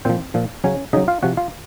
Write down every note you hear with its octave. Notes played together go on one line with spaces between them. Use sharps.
A#2 F3 C4 C5
A#2 F3
C#3 F#3 C#4 C#5
C#3 F#3 D#4 D#5
F4 F5
C3 F3 F#4 F#5
F4 F5